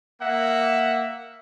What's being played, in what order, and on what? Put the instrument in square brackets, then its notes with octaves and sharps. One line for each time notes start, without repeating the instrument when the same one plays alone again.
[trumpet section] A#3 E5 F#5